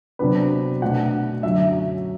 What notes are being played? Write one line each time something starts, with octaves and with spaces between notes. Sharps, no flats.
C3 F#3 B3 D4 B4
B2 A3 D4 F#5
F#2 D3 F#3 E5